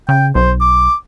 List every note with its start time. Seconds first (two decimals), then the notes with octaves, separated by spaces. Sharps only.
0.09 C#3 G5
0.35 B1 C5
0.61 D6